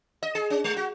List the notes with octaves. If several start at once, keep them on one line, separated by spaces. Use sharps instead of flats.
D#5
G#4
C#4
G#3
F#4